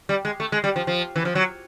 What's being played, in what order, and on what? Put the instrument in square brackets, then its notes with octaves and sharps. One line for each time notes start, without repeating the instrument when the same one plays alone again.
[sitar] G3
G#3
A3
G#3
G3
F3
F3
E3
F3
F#3